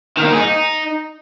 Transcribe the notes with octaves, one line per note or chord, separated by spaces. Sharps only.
D#3
A#3
D#4
G#4
D#4